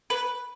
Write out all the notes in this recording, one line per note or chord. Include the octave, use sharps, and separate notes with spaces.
B4